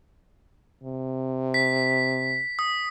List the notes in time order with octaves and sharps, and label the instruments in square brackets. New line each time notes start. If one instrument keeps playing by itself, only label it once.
[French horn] C3
[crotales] B6
D#6